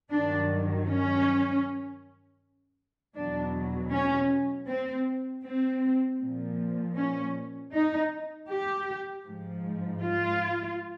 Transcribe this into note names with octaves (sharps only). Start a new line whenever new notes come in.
G2 D#3 F#3 D4
C#4
E2 B2 F#3 D4
C#4
C4
C4
A#2 F3
C#4
D#4
G4
G#2 F3
F4